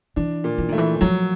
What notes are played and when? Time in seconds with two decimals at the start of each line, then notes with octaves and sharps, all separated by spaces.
0.16 E3 D4
0.44 A#2
0.58 E3
0.69 D#3 A3
0.78 E3
1.01 F3 F#3